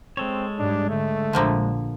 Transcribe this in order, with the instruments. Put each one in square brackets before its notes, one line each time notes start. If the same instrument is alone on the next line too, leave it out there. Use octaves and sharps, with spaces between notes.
[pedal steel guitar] G#3 A4 C#5 [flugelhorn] C4
[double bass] G#2 G3 [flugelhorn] D4
[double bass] D3 [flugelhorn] A3
[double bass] A#1 [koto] D3 F3 A#3